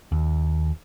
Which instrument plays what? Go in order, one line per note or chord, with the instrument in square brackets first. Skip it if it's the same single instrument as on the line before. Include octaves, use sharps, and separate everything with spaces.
[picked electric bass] D#2